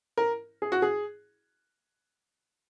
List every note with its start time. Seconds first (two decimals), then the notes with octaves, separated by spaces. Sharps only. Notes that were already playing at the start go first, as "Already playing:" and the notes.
0.17 A#4
0.62 G#4
0.72 F#4
0.82 G#4